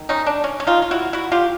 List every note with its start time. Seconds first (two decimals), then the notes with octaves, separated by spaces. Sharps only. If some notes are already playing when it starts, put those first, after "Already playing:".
Already playing: D#3
0.09 C#4 D#4
0.27 D4
0.44 C#4
0.60 C#4
0.67 D#4 F4
0.82 F4
0.91 E4 F#4
1.13 E4 F#4
1.32 F4 G4